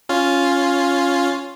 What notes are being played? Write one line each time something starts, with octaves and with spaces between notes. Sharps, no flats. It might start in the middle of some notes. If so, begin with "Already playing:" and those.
C#4 F4